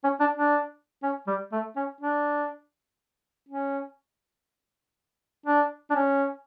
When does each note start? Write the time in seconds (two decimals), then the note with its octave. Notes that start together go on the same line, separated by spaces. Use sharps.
0.04 C#4
0.20 D4
0.37 D4
1.03 C#4
1.27 G3
1.52 A3
1.76 C#4
2.01 D4
3.49 C#4
5.46 D4
5.90 D4
5.96 C#4